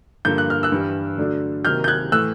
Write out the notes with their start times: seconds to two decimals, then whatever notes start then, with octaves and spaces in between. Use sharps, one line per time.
0.25 G2 D3 F3 A#3 G6
0.38 F#6
0.50 F6
0.63 E6 F#6
0.72 G2 E3 G3
1.18 D3 F#3 A3 D4
1.65 C3 D#3 F#3 A#3 F6 G6
1.84 G6
1.88 F#6 G#6
2.12 A2 E3 A3 E6 F#6